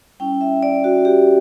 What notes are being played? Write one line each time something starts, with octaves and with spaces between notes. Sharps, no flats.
G3 C#4 E4 G5
E5
D5
F#4
G4